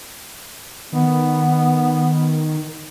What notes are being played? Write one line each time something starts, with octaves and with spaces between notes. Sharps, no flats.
D#3 B3